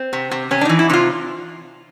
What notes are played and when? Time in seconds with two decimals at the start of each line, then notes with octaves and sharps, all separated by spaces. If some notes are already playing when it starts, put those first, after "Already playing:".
Already playing: C4
0.13 C3
0.31 C3
0.51 C3 C#4
0.61 D4
0.65 E3 D#4
0.79 E4
0.90 C3 E4
0.93 F4